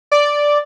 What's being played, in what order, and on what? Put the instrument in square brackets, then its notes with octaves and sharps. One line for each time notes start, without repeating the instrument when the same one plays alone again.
[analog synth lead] D5